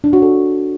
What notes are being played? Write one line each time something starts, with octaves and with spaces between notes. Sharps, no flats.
D4
F#4
A4